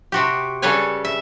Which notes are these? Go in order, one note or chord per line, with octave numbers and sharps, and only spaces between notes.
C3 F#4 G4
C#3 G3 A4 B4 C#5 G#5
E5